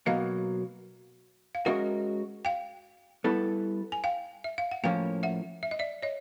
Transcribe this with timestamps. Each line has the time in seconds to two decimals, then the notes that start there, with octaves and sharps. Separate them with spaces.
0.06 B2 F#3 A#3 D#5 F5
1.55 F5
1.65 G#3 C#4 F#4 A#4 D#5 E5 F#5
2.45 F5 G5
3.24 G3 B3 E4 A4
3.92 G#5
4.04 F5 G5
4.44 E5
4.58 F5
4.71 F#5
4.84 A2 F3 A#3 C#4 F5 G5
5.23 E5 F#5
5.63 E5
5.71 D#5
5.79 D5 E5
6.02 C#5 D#5